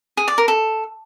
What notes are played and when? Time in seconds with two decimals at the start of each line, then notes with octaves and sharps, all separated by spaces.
0.17 G#4
0.28 D5
0.38 A#4
0.48 A4